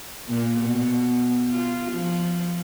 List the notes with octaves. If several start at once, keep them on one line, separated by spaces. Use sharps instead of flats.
A#2
B2
F4
F3